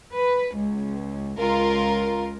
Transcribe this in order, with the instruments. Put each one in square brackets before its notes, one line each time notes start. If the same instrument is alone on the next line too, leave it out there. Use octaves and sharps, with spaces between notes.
[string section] B4
C#2
C#2 F4 A#4